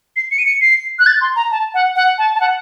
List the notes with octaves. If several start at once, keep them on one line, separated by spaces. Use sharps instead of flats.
C7
C#7
D#7
C#7
C7
F#6
A6
C6
A#5
A5
F#5
F#5
A5
A5
F#5